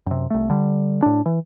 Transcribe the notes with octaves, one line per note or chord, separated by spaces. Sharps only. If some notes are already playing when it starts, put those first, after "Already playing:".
F#2 C3
C2 A3
D3 G3
A2 D4
E3